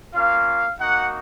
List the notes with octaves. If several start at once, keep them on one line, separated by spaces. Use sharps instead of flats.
A#3 C#4 F4 F5
A#3 D#4 F#4 F#5